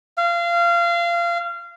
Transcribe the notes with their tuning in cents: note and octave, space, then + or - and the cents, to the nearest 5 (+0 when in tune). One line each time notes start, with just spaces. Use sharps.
F5 -25